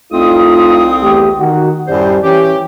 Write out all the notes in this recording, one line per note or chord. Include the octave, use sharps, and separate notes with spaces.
C2 A3 C4 D#4 F4 D#6
E2 A3 G4
D#3 F#4
F#2 A2 G3 C5
E3 C#4 G4